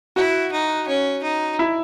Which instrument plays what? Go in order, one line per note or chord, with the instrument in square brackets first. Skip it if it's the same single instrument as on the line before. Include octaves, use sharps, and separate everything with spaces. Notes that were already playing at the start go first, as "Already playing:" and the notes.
[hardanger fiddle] E4 [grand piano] F#4
[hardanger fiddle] D#4
C#4
D#4
[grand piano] E4